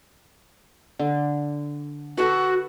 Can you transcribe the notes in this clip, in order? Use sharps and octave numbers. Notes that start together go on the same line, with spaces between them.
D3
F#4 A4 B4